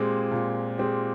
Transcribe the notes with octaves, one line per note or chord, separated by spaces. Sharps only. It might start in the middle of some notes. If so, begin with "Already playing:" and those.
Already playing: A#2 G#3 C4 G4
A#2
G#3 C4 G4